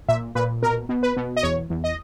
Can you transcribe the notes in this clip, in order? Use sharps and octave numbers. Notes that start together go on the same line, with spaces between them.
A#2 E5
A#2 B4
B2 A#4
B2
B4
B2
D#5
E2 C#5
E2
D#5